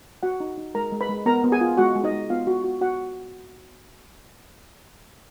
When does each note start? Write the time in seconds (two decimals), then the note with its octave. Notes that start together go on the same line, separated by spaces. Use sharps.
0.23 F#4 F#5
0.40 D#4
0.58 D#4
0.75 G#3 A#4 A#5
0.92 G#3
1.01 B4 B5
1.09 G#3
1.26 B3 A#4 A#5
1.44 B3
1.52 G#4 G#5
1.61 F4
1.77 G#3 F#4 F#5
1.95 G#3
2.04 D#4 D#5
2.12 G#3
2.30 B3 F4 F5
2.47 F#4
2.64 F#4
2.81 F#4 F#5